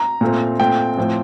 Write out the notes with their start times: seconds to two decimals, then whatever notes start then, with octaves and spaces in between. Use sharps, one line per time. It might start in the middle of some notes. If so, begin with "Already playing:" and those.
Already playing: A#5
0.21 A#2 A3 C4
0.60 A#2 A3 C4 G5
0.97 A2 F3 C4